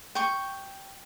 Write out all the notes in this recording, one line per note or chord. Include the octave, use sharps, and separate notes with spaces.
G5 C#6